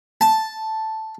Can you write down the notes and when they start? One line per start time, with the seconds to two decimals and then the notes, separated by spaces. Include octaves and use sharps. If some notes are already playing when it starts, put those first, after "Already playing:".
0.21 A5